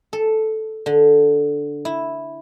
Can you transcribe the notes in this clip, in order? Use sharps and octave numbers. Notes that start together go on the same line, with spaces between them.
A4
D3
E4